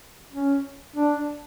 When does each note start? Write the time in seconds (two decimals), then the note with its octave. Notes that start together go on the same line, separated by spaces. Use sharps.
0.33 C#4
0.96 D4